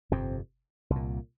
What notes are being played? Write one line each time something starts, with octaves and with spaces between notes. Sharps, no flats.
G1 F2 C3 C4
C2
A#2